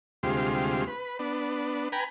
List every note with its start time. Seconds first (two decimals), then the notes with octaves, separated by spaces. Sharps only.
0.23 D2 C3 G3 G#3 F4 C6
0.87 B4
1.19 B3 D4
1.92 B4 G5 G#5 A#5 B5